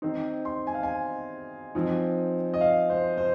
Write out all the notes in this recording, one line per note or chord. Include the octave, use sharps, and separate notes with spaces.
D#3 C4 D#4 C5
C6
G#5
F5
G#5
F3 C4 D#4
D#5
F5
C5
C5